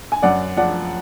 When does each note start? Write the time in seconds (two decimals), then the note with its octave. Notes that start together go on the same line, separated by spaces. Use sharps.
0.12 G#5
0.22 F#2 D5 F#5
0.57 F3 D5 F#5